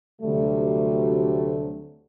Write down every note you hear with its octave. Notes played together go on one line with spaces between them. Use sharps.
D2 C3 F#3 G3 A3